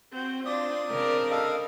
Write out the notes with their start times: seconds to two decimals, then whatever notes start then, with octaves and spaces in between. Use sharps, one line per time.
0.13 C4 F#4
0.46 C4 D4 F4 D5 D#6
0.90 C#3 C4 D4 A#4
1.31 G3 A4 D#5 F5